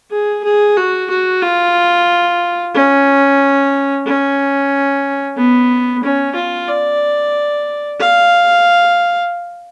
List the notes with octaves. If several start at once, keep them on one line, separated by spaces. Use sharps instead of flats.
G#4
G#4
F#4
F#4
F4
C#4
C#4
B3
C#4
F4
D5
F5